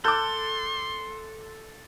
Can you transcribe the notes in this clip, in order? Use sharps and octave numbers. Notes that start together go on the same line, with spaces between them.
A4 C6 D6 F#6 G6